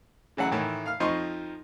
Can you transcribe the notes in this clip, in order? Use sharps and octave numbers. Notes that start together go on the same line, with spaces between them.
C#3 E3 F#3 F#5
A2 D#3 E3
F5 F6
F2 F3 D#4 D#5 C6 C#6